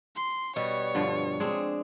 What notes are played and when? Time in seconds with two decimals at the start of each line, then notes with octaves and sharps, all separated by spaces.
0.16 C6
0.56 B2 G3 F#4 C#5
0.95 G2 D3 F3
1.40 G#3 C4 D4 G#4